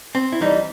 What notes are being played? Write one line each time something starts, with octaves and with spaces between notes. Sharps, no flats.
C4
E4
C2 C3 E3 G3 D#4